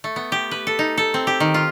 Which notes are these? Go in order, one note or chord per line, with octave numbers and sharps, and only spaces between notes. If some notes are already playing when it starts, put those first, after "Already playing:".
A3
B3
G4
B4
A4
D#4
A4
C4
G4
D#3
F4